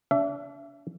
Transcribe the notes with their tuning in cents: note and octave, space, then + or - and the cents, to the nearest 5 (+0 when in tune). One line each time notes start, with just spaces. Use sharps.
D4 -35 E5 +25